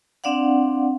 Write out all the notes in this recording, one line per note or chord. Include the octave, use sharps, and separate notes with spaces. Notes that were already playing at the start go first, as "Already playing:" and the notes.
C4 D4 D5 F5 F#5